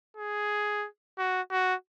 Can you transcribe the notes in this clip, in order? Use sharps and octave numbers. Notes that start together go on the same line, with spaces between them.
G#4
F#4
F#4